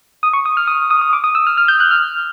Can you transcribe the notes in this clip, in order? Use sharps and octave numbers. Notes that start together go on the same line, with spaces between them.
D#6
C#6
D#6
F6
D#6
D#6
D#6
D6
D#6
E6
F6
F6
G6
F#6
F6